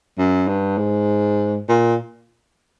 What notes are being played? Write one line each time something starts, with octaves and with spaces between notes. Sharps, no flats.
F#2
G2
G#2
A#2